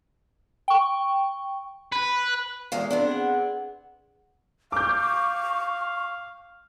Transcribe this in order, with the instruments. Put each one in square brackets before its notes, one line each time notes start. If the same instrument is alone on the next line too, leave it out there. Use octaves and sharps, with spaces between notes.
[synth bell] G5 C#6
[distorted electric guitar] B4
[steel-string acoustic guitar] E2 G#3 F5
B3 C4 D4
[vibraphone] G#4 F#5
[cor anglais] F5 [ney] C#6 [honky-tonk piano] D6 G6